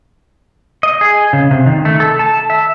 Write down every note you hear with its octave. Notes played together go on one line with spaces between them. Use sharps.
D#5
G#4
C#3
C3
D#3
A3
A4
A5
E5